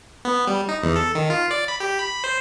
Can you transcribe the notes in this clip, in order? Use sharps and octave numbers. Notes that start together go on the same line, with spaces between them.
B3
G3
D#4
E2
A4
D#3
F4
D5
B5
G4
B5
C5